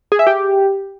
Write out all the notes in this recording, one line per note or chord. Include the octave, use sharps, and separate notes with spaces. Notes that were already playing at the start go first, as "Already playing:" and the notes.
G#4
E5
G4